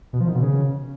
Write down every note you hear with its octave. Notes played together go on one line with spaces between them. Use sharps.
B2
F3
D#3
B2
C#3